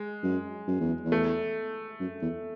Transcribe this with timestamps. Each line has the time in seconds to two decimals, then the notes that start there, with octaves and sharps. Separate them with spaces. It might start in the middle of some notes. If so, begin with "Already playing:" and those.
Already playing: G#3
0.23 F#2
0.68 F#2
0.80 E2
1.05 E2
1.12 A3
2.00 F#2
2.22 E2